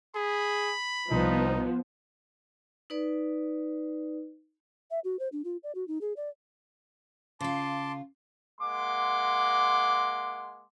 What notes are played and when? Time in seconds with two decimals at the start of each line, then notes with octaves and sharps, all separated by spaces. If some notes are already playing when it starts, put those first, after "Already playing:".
0.15 G#4 B5
1.11 C2 F3 B3 D#4
2.90 D#4 B4 D5
4.91 E5
5.04 F#4
5.19 C5
5.32 D4
5.45 F4
5.63 D5
5.75 F#4
5.88 D#4
6.01 G#4
6.17 D5
7.41 C#3 F4 A5 C6 D6
8.61 G#3 A#3 F#5 C6 D6